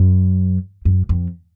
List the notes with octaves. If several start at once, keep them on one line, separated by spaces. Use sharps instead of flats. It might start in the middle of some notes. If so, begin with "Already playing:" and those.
Already playing: F#2
F#2
F2